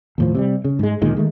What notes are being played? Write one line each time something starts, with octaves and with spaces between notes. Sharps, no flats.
D#2 A2 F3
C3 F#3 G3
C#3
G#2 G#3
D2 A#2 D#3 G#3
D#3 G#3 A3